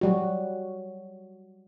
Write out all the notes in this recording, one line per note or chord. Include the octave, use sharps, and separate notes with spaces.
F#3 G3 F#4